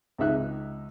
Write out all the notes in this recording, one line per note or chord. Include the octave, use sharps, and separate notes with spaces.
C#2 G#3 D#4 E5 F#6